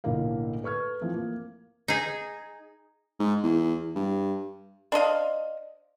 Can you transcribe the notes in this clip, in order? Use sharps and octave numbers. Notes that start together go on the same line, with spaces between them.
B1 A2 D3 A#3 A#4 F5
A4 B4 C#6 F6 G#6
E3 F3 A3 C4
A#3
D#4 G#4
G#2
E2
G2
D4 C5 D#5 F5